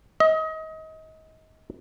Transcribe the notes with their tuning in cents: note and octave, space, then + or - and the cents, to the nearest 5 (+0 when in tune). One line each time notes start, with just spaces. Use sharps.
D#5 +30